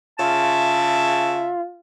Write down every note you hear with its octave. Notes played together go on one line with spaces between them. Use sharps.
C#3 F4 E5 A5